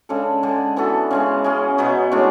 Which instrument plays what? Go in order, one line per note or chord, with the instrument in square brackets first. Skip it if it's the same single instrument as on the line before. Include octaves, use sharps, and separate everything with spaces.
[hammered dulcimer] C#3 G#3 D4 A4
D3 G#3 D4
E3 B3 F#4 A4
C#3 G#3 C#4
G#3 C#4 G#4
B2 F#3 B3
A2 G#3 D4 F#4